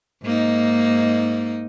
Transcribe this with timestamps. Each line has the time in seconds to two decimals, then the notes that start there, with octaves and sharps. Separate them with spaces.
0.23 G#2 A#3 D#4